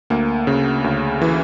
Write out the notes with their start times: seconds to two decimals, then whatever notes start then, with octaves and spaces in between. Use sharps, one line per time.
0.10 D2 A#3
0.47 C#3
0.84 D2
1.22 E3